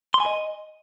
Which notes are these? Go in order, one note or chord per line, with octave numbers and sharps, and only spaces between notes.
C6
G#5
D#5